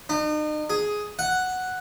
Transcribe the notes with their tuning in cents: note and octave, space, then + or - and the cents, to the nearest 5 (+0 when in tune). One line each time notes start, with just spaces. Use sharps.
D#4 -40
G#4 +5
F#5 +0